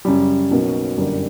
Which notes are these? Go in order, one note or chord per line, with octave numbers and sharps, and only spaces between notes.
F#2 C#3 G3
B1 B2 A#3 C#4
G1 F#2 D3 G3 A#3